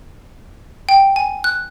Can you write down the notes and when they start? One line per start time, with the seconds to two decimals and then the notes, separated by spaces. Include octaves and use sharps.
0.89 G5
1.16 G#5
1.44 F#6